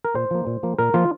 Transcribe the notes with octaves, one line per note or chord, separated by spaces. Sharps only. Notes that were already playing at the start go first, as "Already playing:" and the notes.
A#4
A#2 C5
F3 A#3
A#2
F3 A#3
A#2 A#4
F3 A#3 F4